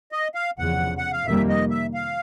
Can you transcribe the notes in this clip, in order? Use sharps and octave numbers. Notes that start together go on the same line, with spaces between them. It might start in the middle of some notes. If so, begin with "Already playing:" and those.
D#5
F5
F1 E2 C#3 F3 F#5
F#5
F5
F2 C3 D#3 G3 A#3 E5
D#5
E5
F5